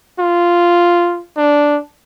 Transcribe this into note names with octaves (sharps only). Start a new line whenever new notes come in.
F4
D4